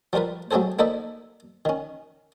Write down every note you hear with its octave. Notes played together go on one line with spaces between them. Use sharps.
F3 G3 F4 A#4 B4
F#3 A3 C4 G#4 A4 C5
A#3 D#4 A4 C5 D5 E5
D#3 C#4